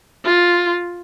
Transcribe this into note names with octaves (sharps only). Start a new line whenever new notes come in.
F4